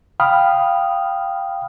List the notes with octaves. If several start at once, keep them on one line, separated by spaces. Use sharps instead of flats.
F5 G5 B5 D#6 F6